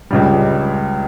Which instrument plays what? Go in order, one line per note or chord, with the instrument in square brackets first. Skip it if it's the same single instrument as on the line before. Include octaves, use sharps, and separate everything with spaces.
[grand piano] C#2 C#3 G3